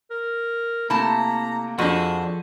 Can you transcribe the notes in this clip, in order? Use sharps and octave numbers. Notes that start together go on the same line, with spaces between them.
A#4
C3 A3 A#3 E4 A5 A#5
F2 F3 D4 F#4 G#4 A4